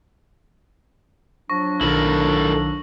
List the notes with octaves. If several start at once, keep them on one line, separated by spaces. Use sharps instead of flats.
F3 F#3 D4 C#6 A#6
B1 D#3 E4 A4 A#4 F#7